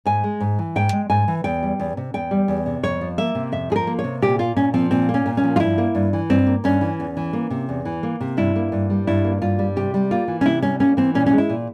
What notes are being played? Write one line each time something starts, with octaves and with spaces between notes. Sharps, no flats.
G#2 G#5
G#3
G#2
E3
G#2 G5
G#3
G#2 G#5
E3
E2 G5
G3
E2
C3
E2 G5
G3
E2
C3
F2 C#5
F3
A#3 E5
C3
F2 E5
F3 G#4
A#4
A#3
C#5
C3
A#2 G4
A#3 F4
A#2 C#4
F3 C4
A#2 C4
A#3
C#4
A#2
C#4
F3
F4
G2 E4
A#3
G2
E3
G2 C4
A#3
G2 C#4
E3
E2
E3
A#3
C3
E2
E3
A#3
C3
G2 E4
A#3
G2
G3
G2 E4
A#3
G2 F4
G3
C3 G4
G3
A#3 F4
E3
C#4
C3 E4
G3 C#4
A#3 C#4
E3 C4
A#2 C#4
C#4
G#3
E4
A#2